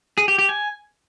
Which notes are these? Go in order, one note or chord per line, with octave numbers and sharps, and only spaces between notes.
G#4
G4
G4
G#5